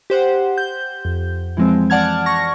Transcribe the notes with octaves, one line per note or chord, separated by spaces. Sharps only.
G4 C5 F#5
G6
F2
E3 F3 G#3 C4
D5 F#5 A5 F6 G#6
C#6 A#6